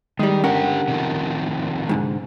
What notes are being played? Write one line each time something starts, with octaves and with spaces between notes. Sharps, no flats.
D#3 G3 G#3
D3 C#4 G4 A#4 F#5
C3 D#3 F3
G#2 D3